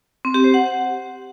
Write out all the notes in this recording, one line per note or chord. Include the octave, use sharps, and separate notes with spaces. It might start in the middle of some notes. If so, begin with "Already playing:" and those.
C4
G4
C5
F#5